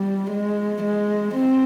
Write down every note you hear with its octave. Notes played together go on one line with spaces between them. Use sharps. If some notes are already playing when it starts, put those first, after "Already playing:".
Already playing: G3
G#3
G#3
C4